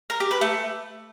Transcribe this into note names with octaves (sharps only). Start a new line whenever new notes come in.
A#4
G4
B4
A3